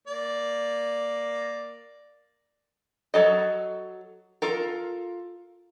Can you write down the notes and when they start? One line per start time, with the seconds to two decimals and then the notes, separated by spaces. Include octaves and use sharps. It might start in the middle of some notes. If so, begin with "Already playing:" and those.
0.07 A#3 D5
3.14 F#3 A4 D#5
4.42 F4 A4 A#4